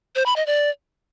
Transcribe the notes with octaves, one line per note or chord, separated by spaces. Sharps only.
C5
B5
D#5
D5